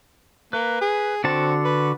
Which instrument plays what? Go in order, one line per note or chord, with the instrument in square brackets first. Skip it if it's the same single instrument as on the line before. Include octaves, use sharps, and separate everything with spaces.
[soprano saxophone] A#3 [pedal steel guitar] B4
[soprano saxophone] G#4
[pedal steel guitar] D3 F#4 A5 [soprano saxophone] C4
[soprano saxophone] B4